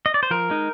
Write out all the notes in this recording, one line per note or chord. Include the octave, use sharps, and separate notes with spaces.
D#5
D5
C5
F3 A#4
G#3 D#4